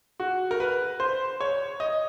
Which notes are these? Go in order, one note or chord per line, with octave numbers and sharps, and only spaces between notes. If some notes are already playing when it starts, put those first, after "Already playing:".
F#4
A#4
B4
C5
C#5
D#5